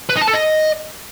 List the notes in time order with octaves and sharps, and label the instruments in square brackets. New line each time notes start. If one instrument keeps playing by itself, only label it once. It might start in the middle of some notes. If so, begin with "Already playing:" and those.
[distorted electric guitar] B4
D#4
A5
A4
D#5